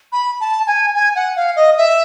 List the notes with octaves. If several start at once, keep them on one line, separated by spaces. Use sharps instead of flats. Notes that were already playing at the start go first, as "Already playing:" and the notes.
B5
A5
G#5
G#5
F#5
F5
D#5
E5